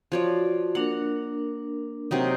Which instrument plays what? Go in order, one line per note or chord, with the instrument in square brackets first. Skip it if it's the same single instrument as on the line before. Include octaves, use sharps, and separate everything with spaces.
[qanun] F3 C#5 D5 [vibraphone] F#4
[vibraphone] A#3 D4 A#4 [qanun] F#5
[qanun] C3 F#3 D#4